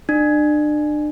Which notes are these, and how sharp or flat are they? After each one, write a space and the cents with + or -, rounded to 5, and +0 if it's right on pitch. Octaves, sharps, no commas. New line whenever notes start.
D4 +35